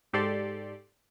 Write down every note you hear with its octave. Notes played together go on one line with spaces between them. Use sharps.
G#2 G4 A4 D5 C6